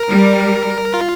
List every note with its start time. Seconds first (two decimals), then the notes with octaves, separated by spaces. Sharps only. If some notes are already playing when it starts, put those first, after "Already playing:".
Already playing: A#4
0.09 G3
0.94 F4